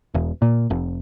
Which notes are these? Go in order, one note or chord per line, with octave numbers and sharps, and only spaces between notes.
E1
A#2
F1